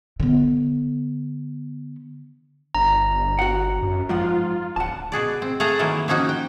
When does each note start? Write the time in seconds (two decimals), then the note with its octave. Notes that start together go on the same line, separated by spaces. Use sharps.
0.20 D3 B3
2.75 G1 A#5
3.39 F#4 F#5
3.82 F#2
4.09 G#2 F3 F4 F#5
4.76 D1 F#5 A5
5.12 B2 F#4 G#4 D5
5.42 C4
5.60 A3 G#4 F5 F#5 A5 A#5
5.79 D#3 E3 F#3 A3 A#3
6.08 F3 A#3 C#4 D#4 F#4
6.29 G5